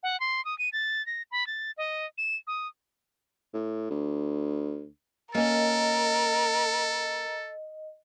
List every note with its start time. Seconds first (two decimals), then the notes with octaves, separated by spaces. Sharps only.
0.03 F#5
0.20 C6
0.45 D#6
0.59 D#7
0.73 A6
1.06 A#6
1.31 B5
1.47 A6
1.78 D#5
2.18 E7
2.47 D#6
3.54 A2
3.90 D2
5.35 A#3 C#4 A4 A#4 D#5